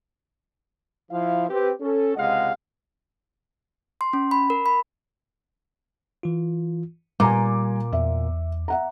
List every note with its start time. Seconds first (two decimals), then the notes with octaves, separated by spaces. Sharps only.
1.11 F3 E4 F5
1.49 C4 G4 B4
1.81 C#4 A4
2.16 C#2 C3 G#3 D#5 F5 F#5
4.01 C6
4.13 C#4
4.31 B5
4.50 A#4
4.66 B5
6.23 E3 F4
7.20 A#2 G3 G#5 A#5 D6
7.93 E2 E5
8.68 E5 F#5 A#5